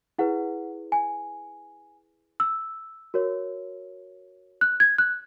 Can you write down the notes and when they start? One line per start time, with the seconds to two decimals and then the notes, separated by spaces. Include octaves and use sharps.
0.18 E4 G#4 B4 F#5
0.92 G#5
2.40 E6
3.14 F#4 A#4 C#5
4.61 F#6
4.80 G#6
4.98 F#6